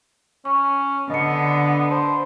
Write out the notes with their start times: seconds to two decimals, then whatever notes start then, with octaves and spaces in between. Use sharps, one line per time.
0.45 C#4 C#6
1.10 D3 B3 D#5 C#7
1.91 C5 A5 B5